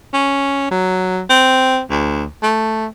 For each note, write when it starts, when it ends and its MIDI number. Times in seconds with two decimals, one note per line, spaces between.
0.13 0.69 61
0.71 1.22 54
1.30 1.81 60
1.90 2.25 38
2.43 2.86 57